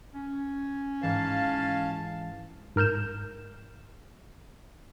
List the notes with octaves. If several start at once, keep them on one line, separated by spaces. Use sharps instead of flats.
C#4
G#2 E3 F5 A5
G#2 A#4 F6 G6 E7